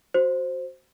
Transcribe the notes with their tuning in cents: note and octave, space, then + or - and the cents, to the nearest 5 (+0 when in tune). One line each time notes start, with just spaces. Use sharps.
F#4 +0 C5 +0